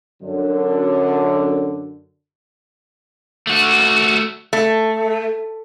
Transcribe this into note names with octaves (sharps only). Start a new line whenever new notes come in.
F#2 D3
A3 F#4
A3